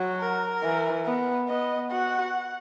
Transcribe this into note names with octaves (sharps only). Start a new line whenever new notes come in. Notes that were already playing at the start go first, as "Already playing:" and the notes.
Already playing: F#3
A#4
E3
B3
B3 D#5
F#4 F#5